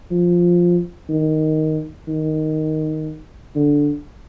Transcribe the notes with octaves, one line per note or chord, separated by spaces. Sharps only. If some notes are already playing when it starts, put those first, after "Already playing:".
F3
D#3
D#3
D3